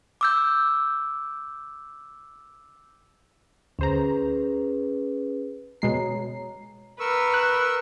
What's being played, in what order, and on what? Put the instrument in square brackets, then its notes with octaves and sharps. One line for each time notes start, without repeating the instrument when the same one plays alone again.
[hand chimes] D6 E6 G6
[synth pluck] D2 C5 A#5 [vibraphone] C#4 G#4 B4
[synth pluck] B2 G#3 C7 [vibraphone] C#5 A#5
[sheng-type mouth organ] A#4 C#6 E6 [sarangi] B4
[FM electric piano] F#6